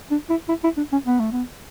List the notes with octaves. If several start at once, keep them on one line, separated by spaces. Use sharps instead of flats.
D4
E4
E4
E4
D4
C#4
B3
A3
B3